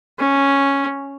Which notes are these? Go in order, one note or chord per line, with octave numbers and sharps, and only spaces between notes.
C#4